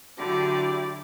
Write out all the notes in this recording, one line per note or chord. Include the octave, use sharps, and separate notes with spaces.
D3 F#3 E4 F#4 G4 D5